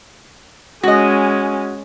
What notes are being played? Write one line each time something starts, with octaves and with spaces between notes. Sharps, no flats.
G#3 C#4 F#4 D#5